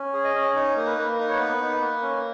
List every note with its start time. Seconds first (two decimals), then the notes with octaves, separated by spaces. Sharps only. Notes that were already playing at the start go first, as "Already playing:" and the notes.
Already playing: C#4
0.13 G#4
0.24 D#5
0.34 C#4
0.55 D#4
0.76 A#3
0.87 B4
0.97 A#3
1.18 D#4 B4
1.28 C#5
1.36 B3 B4
1.61 D#4
1.81 A#3
2.02 C#4